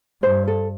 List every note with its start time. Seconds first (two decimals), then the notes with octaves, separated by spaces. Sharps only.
0.22 G2 C5
0.47 A4